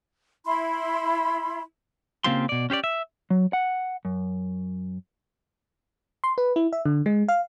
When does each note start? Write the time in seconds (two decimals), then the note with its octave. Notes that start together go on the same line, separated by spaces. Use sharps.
0.46 E4 B5 C6
2.24 C#3 A#3 C4 F4 G4 C6
2.49 B2 D5
2.70 C#4 G4 C5 D5
2.84 E5
3.30 F#3
3.53 F#5
4.05 F#2
6.24 C6
6.38 B4
6.56 E4
6.73 E5
6.86 D3
7.06 G#3
7.28 F5